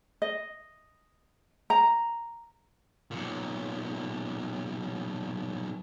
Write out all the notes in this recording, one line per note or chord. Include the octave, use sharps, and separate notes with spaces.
D#5
A#5
B1 A#2